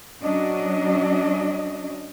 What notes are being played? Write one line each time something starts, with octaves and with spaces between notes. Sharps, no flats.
F#3 C#4 D4 D#5